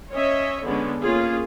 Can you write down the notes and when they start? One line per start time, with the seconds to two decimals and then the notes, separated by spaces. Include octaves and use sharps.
0.12 C#4 C#5 D#5 E5
0.66 D3 G#3 B3 C#4
1.03 A#3 C#4 F4 G#4